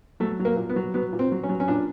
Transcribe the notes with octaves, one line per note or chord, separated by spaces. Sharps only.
F#3 A3
F#3
A#3
A#2
B3
F#3
F#3 B3
A#2
C4
F#3
C#4
F#3
C#4
A#2 D4